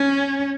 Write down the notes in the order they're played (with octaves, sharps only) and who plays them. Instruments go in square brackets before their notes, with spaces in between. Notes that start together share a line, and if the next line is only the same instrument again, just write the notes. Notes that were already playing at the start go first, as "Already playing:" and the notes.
Already playing: [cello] C#4